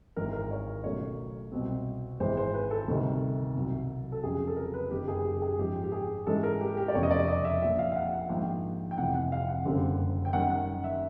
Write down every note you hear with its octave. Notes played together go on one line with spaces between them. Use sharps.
G#1 G#2 E3 A#4
A#4
C#5
C#2 B2 F#3 A3 C#5
C2 B2 G3 C4
G#1 G#2 E3 G#3 C5
C5
B4
A4
D2 C3 D#3 G3 B3
C2 B2 F#3
A4
F2 C#3 F#3 G#4
A4
A#4
B4
F#1 F#2 D#3 G4
G#4
G4
G#4
G#2 F3 G#3 C#4 G4
G4
G#4
G#2 E3 G#3 C#4 A4
A#4
G4
G4
D5
F1 E2 C#3 C#5
D#5
D5
D#5
E5
A#1 A#2 F3 A#3 E5
F5
F5
F#5
F#5
A#1 G#2 D#3 G5
G5
F1 F2 C3 E3 F#5
F#5
F5
F#5
F#1 F#2 D3 G3 C4
G5
F#2 D#3 G3 F#5
F#5
E5